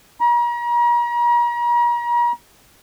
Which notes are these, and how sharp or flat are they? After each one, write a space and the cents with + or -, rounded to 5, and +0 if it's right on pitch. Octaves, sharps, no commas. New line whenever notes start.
A#5 +40